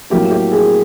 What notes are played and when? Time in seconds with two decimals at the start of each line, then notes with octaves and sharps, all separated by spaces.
0.10 A2 F#3 A#3 G4
0.31 G4
0.52 G#4